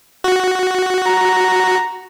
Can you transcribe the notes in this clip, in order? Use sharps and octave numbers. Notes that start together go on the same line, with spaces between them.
F#4
A#5